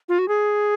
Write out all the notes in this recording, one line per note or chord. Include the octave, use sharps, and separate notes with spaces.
F4
F#4
G#4